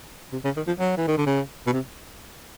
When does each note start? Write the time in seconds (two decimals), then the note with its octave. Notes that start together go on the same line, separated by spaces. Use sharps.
0.33 C3
0.45 C#3
0.57 D#3
0.67 F3
0.80 F#3
0.98 E3
1.08 D#3
1.17 D3
1.27 C#3
1.67 B2
1.73 C3